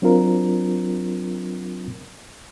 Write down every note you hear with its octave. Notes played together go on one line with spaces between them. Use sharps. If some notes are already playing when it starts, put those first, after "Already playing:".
F#3 C4 D4 F4 A#4